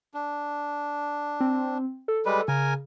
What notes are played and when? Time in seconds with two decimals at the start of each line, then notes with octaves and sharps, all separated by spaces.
0.14 D4
1.40 C4
2.08 A4
2.25 G3 G#3 B4
2.48 C#3 A#4 G#5